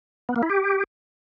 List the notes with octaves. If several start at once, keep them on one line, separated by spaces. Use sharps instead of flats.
B3
A#3
E4
G4